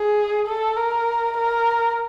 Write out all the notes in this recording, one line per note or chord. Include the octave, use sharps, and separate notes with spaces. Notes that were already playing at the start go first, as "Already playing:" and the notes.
Already playing: G#4
A4
A#4
A#4